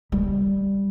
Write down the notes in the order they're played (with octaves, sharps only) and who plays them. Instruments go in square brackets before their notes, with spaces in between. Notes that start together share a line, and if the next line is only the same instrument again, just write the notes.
[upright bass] G3